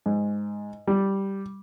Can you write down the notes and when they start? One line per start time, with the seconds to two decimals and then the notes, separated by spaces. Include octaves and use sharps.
0.06 G#2
0.87 G3